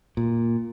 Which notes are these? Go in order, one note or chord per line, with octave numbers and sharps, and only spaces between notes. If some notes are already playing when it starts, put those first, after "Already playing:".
A#2